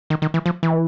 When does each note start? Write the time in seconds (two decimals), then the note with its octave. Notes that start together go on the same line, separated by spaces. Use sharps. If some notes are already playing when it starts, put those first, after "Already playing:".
0.10 D#3
0.22 D#3
0.34 E3
0.46 F3
0.63 E3